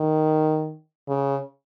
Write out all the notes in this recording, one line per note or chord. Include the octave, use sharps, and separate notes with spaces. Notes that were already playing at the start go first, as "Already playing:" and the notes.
Already playing: D#3
C#3